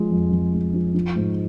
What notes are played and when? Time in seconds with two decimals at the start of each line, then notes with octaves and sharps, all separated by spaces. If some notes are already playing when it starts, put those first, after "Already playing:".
Already playing: F3 G#3
0.11 F2
0.32 F2
0.53 G#3
0.74 F3
0.94 F3
1.16 G#2